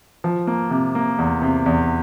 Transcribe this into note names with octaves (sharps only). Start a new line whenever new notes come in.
F3
A#3
C3
A#3
E2
C3
E2